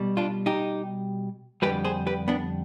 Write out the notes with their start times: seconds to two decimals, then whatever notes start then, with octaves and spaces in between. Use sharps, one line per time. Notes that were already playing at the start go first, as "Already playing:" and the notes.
Already playing: B2 G3
0.17 D4 F4
0.46 D#4 G4
1.62 F2 D3 G3 G4 B4
1.84 G#4 C5
2.07 G4 B4
2.28 B3 D4